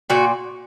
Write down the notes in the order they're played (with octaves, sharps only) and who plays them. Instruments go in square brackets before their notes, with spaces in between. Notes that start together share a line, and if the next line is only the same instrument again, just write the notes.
[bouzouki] A#2 F#4